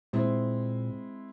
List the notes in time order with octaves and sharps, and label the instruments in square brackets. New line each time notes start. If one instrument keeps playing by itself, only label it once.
[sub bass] A#2 [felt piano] G#3 C4 E4